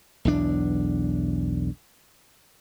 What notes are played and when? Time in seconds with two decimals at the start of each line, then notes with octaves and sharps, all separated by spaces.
0.25 B1 E2 D4